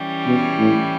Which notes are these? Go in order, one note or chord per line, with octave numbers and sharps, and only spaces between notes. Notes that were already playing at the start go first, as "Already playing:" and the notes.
Already playing: E3 G3 C#4
B2
A2